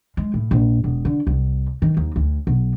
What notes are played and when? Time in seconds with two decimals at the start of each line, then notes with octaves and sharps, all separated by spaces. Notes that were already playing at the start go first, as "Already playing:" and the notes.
0.17 G#3
0.34 A2
0.51 A#1
0.84 E1
1.05 D3
1.27 C2
1.82 D#3
1.97 D#2
2.16 D2
2.47 B1